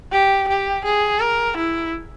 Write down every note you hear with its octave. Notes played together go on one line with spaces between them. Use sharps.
G4
G4
G#4
A#4
E4